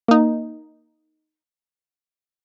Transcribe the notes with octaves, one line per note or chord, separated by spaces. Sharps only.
A#3 D#4